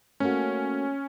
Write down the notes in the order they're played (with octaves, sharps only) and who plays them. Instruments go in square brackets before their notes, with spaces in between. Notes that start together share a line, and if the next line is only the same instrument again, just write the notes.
[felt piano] A3 A#3 F#4 [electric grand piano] C#4